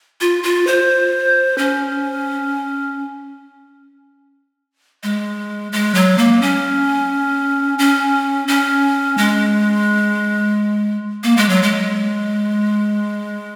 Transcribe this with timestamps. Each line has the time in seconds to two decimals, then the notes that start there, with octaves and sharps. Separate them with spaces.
0.21 F4
0.43 F4
0.67 C5
1.58 C#4
5.03 G#3
5.72 G#3
5.95 F#3
6.18 A#3
6.42 C#4
7.79 C#4
8.48 C#4
9.18 G#3
11.23 A#3
11.37 G#3
11.49 F#3
11.63 G#3